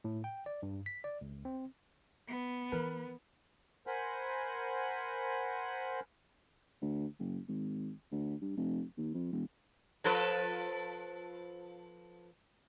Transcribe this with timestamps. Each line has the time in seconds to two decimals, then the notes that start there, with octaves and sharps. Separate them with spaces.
0.04 A2
0.24 G5
0.46 D5
0.63 G2
0.86 B6
1.04 D5
1.21 C#2
1.45 C4
2.28 B3
2.72 E3 A#4 B4
3.87 A#4 C5 F#5 G#5 B5
6.82 D2
7.19 F#1
7.48 G#1
8.12 D2
8.41 G2
8.57 F1
8.98 D#2
9.14 F2
9.32 E1
10.04 F3 A4 B4